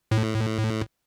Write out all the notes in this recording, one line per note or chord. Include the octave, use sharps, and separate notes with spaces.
A2